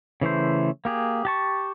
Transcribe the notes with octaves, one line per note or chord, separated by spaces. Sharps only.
C#3 E3 A3 C5
A#3 G4 G#4
G4 A5 C#6